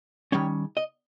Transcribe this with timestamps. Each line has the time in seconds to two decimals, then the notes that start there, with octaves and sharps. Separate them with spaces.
0.32 D#3 G3 C#4 C#5
0.77 D#5